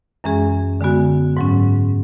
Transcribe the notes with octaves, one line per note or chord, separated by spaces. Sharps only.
F#2 E3 G#3 C#4 G#4
D3 G#3 B3 F#4
G#2 F#3 C#4